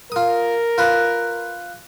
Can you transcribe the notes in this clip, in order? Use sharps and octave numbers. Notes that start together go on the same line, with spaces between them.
F4 A#4 D#6
F4 B4